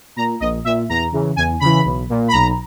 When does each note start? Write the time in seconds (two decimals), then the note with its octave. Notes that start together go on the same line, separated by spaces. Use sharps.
0.16 A#2 A#5
0.40 A#1 D#5
0.64 A#2 E5
0.89 E2 A#5
1.12 C#3 E3
1.36 E2 G#5
1.60 C#3 E3 B5
1.84 B1
2.09 A#2
2.28 B5
2.32 B1 A#5